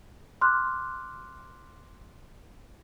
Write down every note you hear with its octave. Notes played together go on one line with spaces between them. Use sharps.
C6 D6 F6 F#6